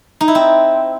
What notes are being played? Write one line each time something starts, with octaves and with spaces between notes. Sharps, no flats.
D#4
E4
C4